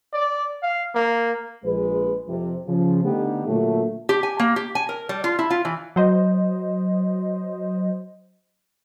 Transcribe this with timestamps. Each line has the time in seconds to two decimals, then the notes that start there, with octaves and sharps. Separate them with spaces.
0.14 D5
0.63 F5
0.95 A#3
1.64 A#1 G#3 B4
2.27 F2 C3
2.67 C#3 F3
3.04 D3 A3 B3 D4 D#4 G4
3.46 A#2 D3 F#3 A3
4.09 G4
4.23 G#5
4.40 A#3
4.56 G4
4.75 G#5
4.89 A#4
5.09 G3
5.24 F4
5.39 E4
5.50 F4
5.65 E3
5.96 F#3 C5 D#5